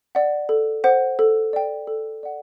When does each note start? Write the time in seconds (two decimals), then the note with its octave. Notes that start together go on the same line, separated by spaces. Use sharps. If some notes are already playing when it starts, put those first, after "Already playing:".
0.15 D5 F#5
0.49 A4
0.84 C5 F#5
1.19 A4
1.53 D5 G5
1.87 A4
2.23 D5 F#5